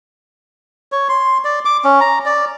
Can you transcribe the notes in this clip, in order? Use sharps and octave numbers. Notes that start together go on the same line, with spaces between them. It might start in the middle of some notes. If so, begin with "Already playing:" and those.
C#5
C6
D5
D6
C#4
A#5
D5